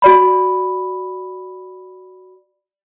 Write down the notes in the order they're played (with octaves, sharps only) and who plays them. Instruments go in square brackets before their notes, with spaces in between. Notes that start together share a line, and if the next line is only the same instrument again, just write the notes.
[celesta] F#4 D5 B5